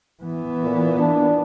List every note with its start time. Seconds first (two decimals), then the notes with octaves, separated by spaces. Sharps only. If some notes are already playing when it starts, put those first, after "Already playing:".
0.23 E3 B3
0.63 A#2
0.99 D4